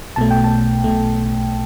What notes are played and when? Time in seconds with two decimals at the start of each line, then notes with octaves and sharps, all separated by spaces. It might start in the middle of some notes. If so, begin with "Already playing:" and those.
0.16 B1 B2 A3 A5
0.31 G5
0.44 A5
0.84 B1 B2 A3